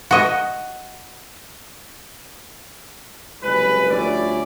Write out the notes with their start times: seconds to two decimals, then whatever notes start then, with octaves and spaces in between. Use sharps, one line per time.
0.11 F#4 D#5
3.42 F#1 C2 F#2 G#3 B4
3.90 D2 F3 G3 C#4 E4 D5